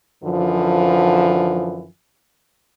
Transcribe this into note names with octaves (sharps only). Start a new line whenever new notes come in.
F#2 D3 E3 F3